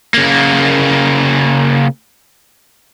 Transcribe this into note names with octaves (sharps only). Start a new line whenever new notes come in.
C#3 A#3